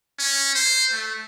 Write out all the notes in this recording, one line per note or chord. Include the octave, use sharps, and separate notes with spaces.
C#4
C5
A3